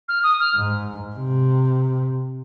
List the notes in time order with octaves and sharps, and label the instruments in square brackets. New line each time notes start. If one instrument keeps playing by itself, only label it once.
[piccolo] F6
D#6
F6
[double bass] G#2
C3